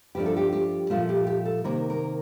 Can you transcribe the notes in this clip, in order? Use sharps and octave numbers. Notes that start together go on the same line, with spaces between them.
G2 F3 A3 D4 G4
A4
G4
G4
A#2 F3 A3 F4
G4
G4
A4
C3 D#3 A#3 A#4
A#4